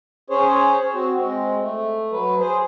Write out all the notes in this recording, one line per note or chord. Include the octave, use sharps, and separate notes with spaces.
C#4 G#4 C5 C#5
C4 F#4
G#3 C4
A3
F#3 B4
G#4 C5